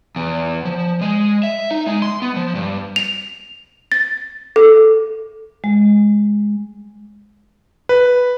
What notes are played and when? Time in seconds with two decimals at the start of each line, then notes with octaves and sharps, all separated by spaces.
0.16 E2
0.65 F3
1.01 G#3
1.43 E5
1.71 D#4
1.87 G#3
2.02 C6
2.22 B3
2.36 F3
2.55 G2
2.96 F7
3.92 A6
4.56 A4
5.64 G#3
7.89 B4